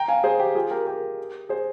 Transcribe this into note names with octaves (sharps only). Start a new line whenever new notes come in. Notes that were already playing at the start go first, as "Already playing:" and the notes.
Already playing: G5 A#5
F5 G#5
G#4 C5
G4
F4 G#4
G4 A#4
G4 A#4
G#4 C5